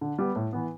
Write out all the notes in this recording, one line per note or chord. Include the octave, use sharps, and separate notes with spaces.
D3
G3 B3
A2
E3 B3